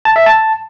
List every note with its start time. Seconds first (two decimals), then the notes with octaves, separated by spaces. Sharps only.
0.05 A5
0.16 E5
0.26 A5